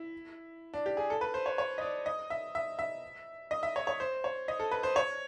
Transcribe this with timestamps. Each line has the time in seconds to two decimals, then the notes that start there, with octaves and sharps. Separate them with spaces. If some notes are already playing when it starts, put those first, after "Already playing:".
Already playing: E4
0.74 D4
0.86 G4
0.97 G#4
1.10 A4
1.21 B4
1.34 C5
1.46 C#5
1.58 C#5
1.78 D#5
1.81 D5
2.06 D#5
2.30 E5
2.55 E5
2.79 E5
3.51 D#5
3.63 E5
3.76 C#5
3.87 C#5
4.00 C5
4.24 C#5
4.48 D#5
4.60 A4
4.71 B4
4.83 C5
4.96 C#5